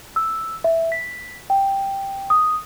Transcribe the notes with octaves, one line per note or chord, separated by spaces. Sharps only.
E6
E5
B6
G5
D#6